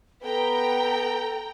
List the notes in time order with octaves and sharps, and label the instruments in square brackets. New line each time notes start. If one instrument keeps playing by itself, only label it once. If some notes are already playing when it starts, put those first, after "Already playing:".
[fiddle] B3 [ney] A4 [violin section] G5 A#5